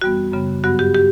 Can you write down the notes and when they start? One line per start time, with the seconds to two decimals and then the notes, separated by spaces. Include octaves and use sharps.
0.01 F#2 E3 G3 B3 F#4
0.33 F#2 C#3 G3 B3
0.64 G2 F#3 B3 F#4
0.79 G4
0.95 G4